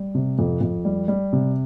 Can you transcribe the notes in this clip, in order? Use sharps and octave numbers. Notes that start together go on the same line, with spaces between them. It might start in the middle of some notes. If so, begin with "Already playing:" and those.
Already playing: G3
C3
F2
F2
G3
G3
C3